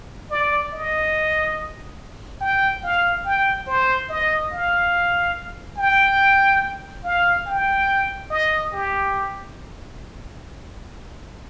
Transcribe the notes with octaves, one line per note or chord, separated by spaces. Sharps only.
D5
D#5
G5
F5
G5
C5
D#5
F5
G5
F5
G5
D#5
G4